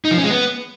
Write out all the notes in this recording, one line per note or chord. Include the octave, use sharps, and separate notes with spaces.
D#4
F3
C#4
G#3
B3